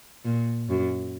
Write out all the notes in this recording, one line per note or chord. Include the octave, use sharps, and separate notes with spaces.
A#2
F#2